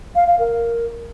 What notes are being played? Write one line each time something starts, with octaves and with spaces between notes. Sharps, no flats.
F5
F5
A#4